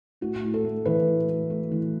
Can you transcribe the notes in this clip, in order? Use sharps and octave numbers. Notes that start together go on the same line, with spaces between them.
A2 F#4
A2
A4
A3
E3 B4
A2
A2
A3
E3